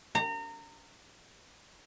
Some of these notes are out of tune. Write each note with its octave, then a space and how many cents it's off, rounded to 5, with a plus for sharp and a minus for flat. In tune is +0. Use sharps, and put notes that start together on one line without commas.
A#5 -30